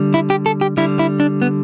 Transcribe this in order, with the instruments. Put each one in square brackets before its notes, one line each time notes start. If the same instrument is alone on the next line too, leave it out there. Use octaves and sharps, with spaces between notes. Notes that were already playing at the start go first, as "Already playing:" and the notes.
Already playing: [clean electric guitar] D3 G3
E4
G4
A4
G4
D3 G3 E4
E4
D4
B3